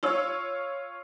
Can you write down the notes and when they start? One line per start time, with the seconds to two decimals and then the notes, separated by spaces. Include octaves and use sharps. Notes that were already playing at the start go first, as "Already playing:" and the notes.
0.03 F4 C#5 E6